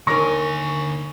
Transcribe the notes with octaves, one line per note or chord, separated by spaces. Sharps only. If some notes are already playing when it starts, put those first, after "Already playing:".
D#2 D3 D4 A#4 G#5 C#6 A#6